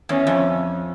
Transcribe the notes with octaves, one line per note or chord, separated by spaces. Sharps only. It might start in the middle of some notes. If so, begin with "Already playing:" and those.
E2 C#4
F2